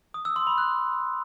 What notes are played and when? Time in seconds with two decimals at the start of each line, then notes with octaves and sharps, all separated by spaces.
0.14 D#6
0.25 E6
0.36 C6
0.47 B5
0.58 F#6